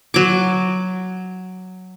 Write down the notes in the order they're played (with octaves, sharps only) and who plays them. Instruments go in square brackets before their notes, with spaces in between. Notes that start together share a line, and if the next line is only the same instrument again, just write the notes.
[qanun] F#3 D6